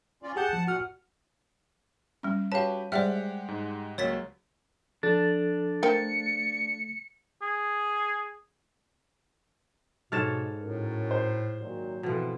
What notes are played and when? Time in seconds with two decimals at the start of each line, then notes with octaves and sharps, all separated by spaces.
0.23 C#4 F4 D5
0.36 G4 G#4 F#5 A5 G6
0.53 F3
0.67 A#2 F#4 F#5 F6
2.23 G3 C#4
2.52 F#4 G4 B4 C#5 F5 A5
2.92 G3 G#3 G4 C5 D5 E5 F#5 B6
3.48 G#2
3.98 C#2 F#3 A#3 C#5 A6 B6
5.03 F3 D4 A4 A6
5.83 F3 A3 A#4 G5 A6 C#7
7.42 G#4
10.12 G#2 B2 A4 C#5 F6 A6 E7
10.61 A2 C#4 F#4 A#4
11.11 C5
11.59 A#2 D#3 F#3
12.03 B2 E3 F3 C4 E4 A4